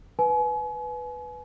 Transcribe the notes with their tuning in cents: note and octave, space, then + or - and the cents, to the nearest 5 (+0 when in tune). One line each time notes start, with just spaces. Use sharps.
B4 +0 G#5 +35